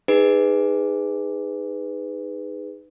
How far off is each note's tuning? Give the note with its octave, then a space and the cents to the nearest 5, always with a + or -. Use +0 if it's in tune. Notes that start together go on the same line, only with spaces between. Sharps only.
D#4 -5 G#4 -15 B4 +10